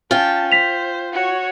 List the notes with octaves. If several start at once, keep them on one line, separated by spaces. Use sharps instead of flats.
C#4 F4 G5 A5
C5 B6 F7
F#4 C#5